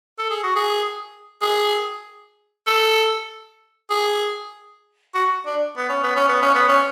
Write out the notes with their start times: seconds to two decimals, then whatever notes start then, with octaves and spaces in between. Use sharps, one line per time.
0.19 A4
0.30 G#4
0.43 F#4
0.56 G#4
1.42 G#4
2.67 A4
3.91 G#4
5.14 F#4
5.46 D4
5.77 B3
5.89 C#4
6.03 B3
6.16 C#4
6.29 B3
6.42 C#4
6.55 B3
6.69 C#4